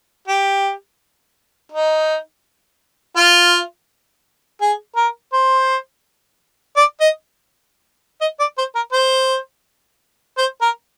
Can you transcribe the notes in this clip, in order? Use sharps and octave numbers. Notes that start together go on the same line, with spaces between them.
G4
D#4
F4
G#4
A#4
C5
D5
D#5
D#5
D5
C5
A#4
C5
C5
A#4